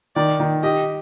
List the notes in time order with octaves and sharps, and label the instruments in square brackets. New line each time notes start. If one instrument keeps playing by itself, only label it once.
[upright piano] D#3 [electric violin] D5
[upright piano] D#3
[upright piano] G4 [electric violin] D#5